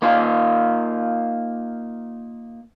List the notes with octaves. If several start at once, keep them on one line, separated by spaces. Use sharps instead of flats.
A#3 D#4 F4